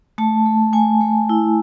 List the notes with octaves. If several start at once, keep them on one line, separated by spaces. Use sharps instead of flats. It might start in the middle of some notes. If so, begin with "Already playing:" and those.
A3 A5
A3
A3 G#5
A3
E4